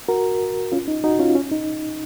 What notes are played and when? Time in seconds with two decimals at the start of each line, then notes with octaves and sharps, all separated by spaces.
0.09 F#4 A#4
0.72 C#4 F4
0.88 D#4
1.04 D#4 F#4
1.19 C#4 F4
1.35 C#4
1.51 D#4